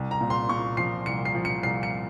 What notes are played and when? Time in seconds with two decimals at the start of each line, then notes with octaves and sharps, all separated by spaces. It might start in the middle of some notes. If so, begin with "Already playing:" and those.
Already playing: C2
0.11 A#5
0.21 A#2
0.30 C6
0.49 A#2 C#6
0.77 F3 C7
1.06 C2 C#7
1.25 C7
1.35 F3
1.45 C#7
1.63 C2 C7
1.83 C#7